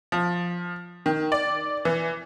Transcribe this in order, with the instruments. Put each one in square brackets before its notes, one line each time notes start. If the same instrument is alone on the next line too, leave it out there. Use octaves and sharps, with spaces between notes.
[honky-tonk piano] F3
D#3
D5
E3